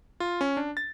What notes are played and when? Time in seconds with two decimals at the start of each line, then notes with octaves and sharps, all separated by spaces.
0.20 F4
0.41 C#4
0.57 D4
0.77 A6